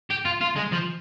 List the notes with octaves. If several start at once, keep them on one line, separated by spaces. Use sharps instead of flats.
G4
F4
F4
G#3
F3